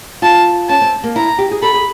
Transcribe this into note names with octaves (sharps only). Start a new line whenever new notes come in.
F4 A5
C#4 A5
C4
A#3
E4 A#5
G4
G#4
A4 B5
G#4